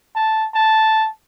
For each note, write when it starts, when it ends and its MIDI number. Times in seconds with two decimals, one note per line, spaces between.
0.16 0.45 81
0.55 1.08 81